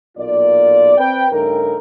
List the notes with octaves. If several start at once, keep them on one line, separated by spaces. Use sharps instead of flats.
B1 A#2 A#3 F4 D5
C4 B4 G5
G2 C#3 A3 D#4 A#4